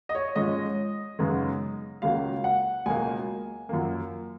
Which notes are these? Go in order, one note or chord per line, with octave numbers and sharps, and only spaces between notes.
D#5
C#5
G#2 F3 G#3 C#4 D#5
F#2 C#3 G#3 B3 D#4
C#2 C#3 F#3 A#3 F5
F#5
C#2 B2 F#3 A#3 G#5
F#2 F3 A#3